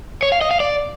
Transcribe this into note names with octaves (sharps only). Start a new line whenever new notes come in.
C#5
F5
D#5
F5
D5